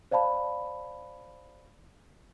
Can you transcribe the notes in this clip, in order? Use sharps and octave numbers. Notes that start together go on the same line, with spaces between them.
C5 D5 F5 A5 B5